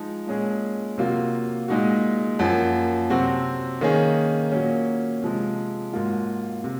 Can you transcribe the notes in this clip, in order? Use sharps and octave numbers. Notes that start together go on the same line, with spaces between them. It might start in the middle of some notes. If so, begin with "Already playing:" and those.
Already playing: F3 G#3 D#4
A#2 G#3 C#4 G#4
C3 F#3 A#3 F4
A#2 G#3 D#4 F#4
F#2 F3 A#3
C3 F#3 C4 F#4
D#3 A#3 C#4 G#4
A#2 F#3 A#3 C#4
C3 F3 G#3
G#2 F#3 A#3 F4
C3